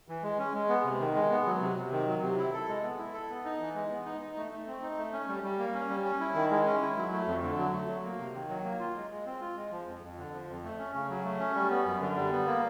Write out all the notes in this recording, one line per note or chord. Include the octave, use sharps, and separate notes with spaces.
E3
G#3
C#4
G#3
B3
C3
D#3
G#3
B3
F#3
C3
C3
D#3
F#3
C3
E4
A4
G#3
B3
E4
A4
B3
D#4
E3
G#3
B3
D#4
D#4
A3
A3
C4
D#4
A3
C#4
G3
G3
A#3
C#4
G3
C#4
E4
D#3
G#3
C#4
E4
F#3
A3
F2
D3
F#3
A3
F#3
A#3
C3
D#3
F#3
A#3
F4
G#3
G#3
C4
F4
G#3
F3
F2
F2
D3
F3
F2
A3
C#4
C#3
F#3
A3
C#4
G3
B3
F#2
D3
G3
B3
A#3